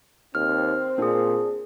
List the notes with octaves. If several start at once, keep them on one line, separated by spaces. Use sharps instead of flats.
D#2 C4 F6
A#2 D4 G#4